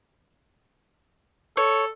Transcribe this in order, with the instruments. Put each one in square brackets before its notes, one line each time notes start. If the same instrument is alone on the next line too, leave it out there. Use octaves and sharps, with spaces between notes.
[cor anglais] A4 [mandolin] C#5